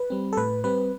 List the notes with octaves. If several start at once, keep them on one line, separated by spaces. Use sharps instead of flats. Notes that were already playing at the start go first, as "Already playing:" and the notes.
Already playing: B4
G3 C4
A4
A2 B4
G3 C4 B4